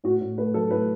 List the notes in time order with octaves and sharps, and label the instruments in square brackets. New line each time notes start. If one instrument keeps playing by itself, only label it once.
[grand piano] A2 F#4
A2
A3 B4
F#3 A4
A2 B4